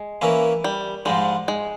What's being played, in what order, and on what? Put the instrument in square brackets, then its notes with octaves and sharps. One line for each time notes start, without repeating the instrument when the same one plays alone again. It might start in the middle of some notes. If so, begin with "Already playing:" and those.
Already playing: [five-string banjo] G#3
[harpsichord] E3 A#3 C#4 E4
[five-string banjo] G3
[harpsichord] G#2 F3 G#3 [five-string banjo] G3
[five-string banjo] G#3